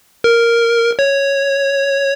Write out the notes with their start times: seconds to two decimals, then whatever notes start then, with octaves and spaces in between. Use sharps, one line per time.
0.24 A#4
0.99 C#5